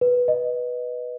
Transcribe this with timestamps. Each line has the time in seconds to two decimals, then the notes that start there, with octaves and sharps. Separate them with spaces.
0.01 B4
0.28 D#5